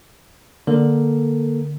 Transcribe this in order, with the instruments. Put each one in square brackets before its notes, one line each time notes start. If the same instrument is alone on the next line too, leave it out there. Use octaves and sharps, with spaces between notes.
[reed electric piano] D3 [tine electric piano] A#3 A4 A#4